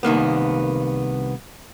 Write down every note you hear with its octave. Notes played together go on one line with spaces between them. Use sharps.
C2 D#3 A#3 B3